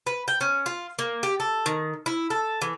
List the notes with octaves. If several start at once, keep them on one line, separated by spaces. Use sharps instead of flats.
B4
G5
C#4
F4
A#3
G4
A4
D#3
E4
A4
E3